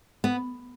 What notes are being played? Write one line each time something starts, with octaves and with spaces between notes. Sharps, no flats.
B3